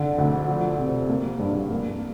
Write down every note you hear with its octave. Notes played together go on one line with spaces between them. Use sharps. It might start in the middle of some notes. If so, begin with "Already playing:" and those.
Already playing: D3
D2
F3
C3
A#3
G2
A#3